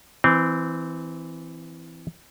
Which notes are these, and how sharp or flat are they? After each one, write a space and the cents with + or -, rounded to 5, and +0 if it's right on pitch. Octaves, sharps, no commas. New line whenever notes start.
E3 +0 C4 -15